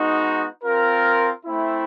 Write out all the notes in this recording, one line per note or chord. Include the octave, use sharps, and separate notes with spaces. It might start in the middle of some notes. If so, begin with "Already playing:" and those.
Already playing: G#3 B3 D#4 F#4
C4 F4 A#4
A3 C4 E4